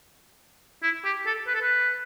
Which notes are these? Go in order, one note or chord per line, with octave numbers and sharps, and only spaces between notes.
E4
G4
A4
B4
A4
B4